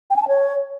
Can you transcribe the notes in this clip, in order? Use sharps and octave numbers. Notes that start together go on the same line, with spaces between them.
G5
G#5
A5
C#5